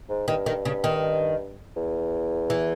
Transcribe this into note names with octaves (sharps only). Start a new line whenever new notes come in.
G#2
G2 D#3
D#3
C#3
D#3
E2
E3